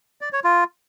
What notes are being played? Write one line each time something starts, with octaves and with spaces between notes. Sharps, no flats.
D5
C#5
F4